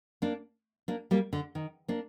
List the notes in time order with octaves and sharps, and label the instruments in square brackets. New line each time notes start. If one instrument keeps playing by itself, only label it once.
[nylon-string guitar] A#3 D4
A#3 D4
G3 A#3
D3
D#3
A#3 D4